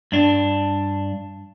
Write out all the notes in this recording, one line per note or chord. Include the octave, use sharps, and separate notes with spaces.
G2 D4